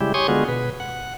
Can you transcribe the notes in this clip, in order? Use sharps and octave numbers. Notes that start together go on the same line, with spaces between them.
C#3 G3 G#3 E4 G4
G4 C#5 G#5 C6 C#6 D#6
D3 G#3 B3 F4 F#4 G#4
B2 B4
F#5